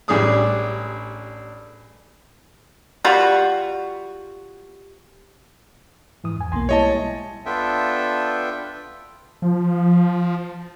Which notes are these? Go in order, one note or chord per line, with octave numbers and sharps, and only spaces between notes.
A1 G3 D4 G#4 D6 D#6
G3 F4 F#4
G#2 E3 D#6
E2 G#5
B1 B2 A#3 G#5 C6
G3 G#3 E4 C#5 D#5 A5
B3 D4 F4 A4 E5 G5
F3